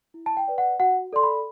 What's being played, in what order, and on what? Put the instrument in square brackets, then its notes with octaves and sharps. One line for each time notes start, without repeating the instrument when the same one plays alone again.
[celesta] E4
A5
G5
B4 D5
F#5
F#4 F#5
A4 D5 C6
B5